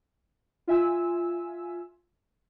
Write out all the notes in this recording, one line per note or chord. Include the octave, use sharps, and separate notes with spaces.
F4 E5 G#5 E6